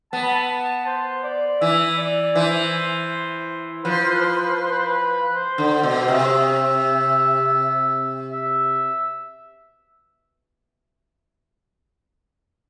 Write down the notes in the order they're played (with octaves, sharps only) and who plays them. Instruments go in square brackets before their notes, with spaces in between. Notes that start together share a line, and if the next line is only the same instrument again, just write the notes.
[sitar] B3 [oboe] A5
[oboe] B5
A5
C5
D5
[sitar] E3 [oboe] E5
[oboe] D5
[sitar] E3 [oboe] C5
[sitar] F3 [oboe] B4
[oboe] C5
B4
C5
B4
C5
B4
C5
B4
C5
B4
C5
B4
C5
B4
C5
[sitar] D3
B2
[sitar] C3 [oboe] E5
[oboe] E5